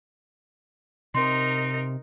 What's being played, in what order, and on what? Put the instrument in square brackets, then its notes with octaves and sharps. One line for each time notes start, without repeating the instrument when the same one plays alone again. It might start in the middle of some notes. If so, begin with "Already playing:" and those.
[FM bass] C3 [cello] D#4 A#4 [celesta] C6